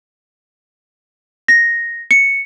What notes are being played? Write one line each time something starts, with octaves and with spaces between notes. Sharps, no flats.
A#6
C#7